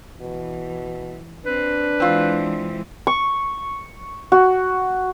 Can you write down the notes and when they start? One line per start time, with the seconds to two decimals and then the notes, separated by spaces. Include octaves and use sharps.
0.21 B2 E3
1.46 C4 D4 B4
2.00 E3 G#3 C4 F4
3.07 C#6
4.32 F#4